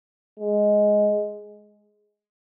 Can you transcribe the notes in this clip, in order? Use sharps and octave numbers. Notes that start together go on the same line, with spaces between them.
G#3